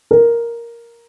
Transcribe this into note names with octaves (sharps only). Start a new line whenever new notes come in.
A#4